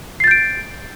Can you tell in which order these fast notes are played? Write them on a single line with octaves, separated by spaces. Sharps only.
C7 A6 G6 D7